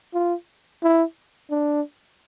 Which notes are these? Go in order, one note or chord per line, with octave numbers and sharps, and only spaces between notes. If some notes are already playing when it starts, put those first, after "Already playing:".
F4
E4
D4